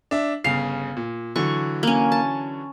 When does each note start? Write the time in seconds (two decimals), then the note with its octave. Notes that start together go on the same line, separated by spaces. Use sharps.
0.11 D4 E5
0.44 G1 C#3 F5 C7
0.97 A#2
1.36 D3 E3 F#3 C#6
1.83 A#3 C#4
2.12 A5